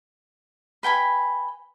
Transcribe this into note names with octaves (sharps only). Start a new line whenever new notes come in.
B4 G5 G#5 B5